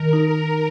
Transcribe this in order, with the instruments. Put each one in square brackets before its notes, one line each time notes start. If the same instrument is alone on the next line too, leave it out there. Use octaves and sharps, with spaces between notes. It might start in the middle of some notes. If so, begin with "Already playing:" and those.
Already playing: [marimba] D#3 [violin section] A#4
[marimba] D#4